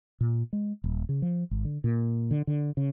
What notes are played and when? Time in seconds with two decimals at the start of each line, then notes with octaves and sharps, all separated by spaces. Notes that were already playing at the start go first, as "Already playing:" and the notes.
0.21 A#2
0.53 G#3
0.84 D#1
1.09 C#3
1.22 F3
1.51 G#1
1.65 D3
1.84 A#2
2.31 D3
2.47 D3
2.77 C#3